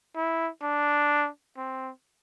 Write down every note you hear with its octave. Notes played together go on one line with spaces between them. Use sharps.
E4
D4
C4